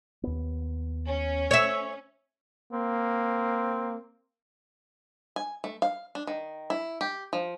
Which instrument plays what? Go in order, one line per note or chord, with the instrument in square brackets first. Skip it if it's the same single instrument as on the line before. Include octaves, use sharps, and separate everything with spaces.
[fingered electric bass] D#2 B3
[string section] C#4
[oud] C#5 E5
[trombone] A#3 [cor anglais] C4
[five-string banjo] G#5
A3
F5
D4
D#3
E4
G4
F3